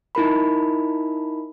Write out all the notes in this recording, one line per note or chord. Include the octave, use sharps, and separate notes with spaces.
D#4 E4 A#4 B5